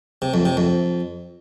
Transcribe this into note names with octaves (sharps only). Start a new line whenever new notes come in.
C3
F2
C3
F2